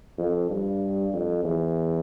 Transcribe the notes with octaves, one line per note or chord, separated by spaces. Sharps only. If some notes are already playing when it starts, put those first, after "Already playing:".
F2
G2
F2
E2